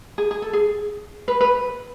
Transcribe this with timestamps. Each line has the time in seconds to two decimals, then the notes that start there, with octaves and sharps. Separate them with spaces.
0.18 G#4
0.31 G#4
0.42 A4
0.53 G#4
1.28 B4
1.41 B4